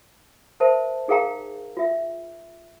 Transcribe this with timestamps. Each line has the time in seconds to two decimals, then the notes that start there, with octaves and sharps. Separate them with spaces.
0.60 A#4 C5 E5 A5
1.08 D#4 G#4 A#4 F5 G5 A#5
1.77 F4 E5